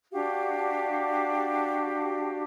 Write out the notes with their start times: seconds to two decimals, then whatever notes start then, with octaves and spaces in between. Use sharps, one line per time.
0.12 D4 F#4 G4 F5